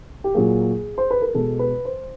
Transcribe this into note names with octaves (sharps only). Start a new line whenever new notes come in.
G4
A#2 F#3 A#3 G#4
C5
B4
A#4
B2 G#3 A4
B4
C5